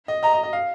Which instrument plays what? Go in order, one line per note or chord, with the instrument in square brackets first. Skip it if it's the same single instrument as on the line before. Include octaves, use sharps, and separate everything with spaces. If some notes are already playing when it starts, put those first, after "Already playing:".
[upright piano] D#5
[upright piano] D#5 [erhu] A#5
[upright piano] D#5
D#5
F5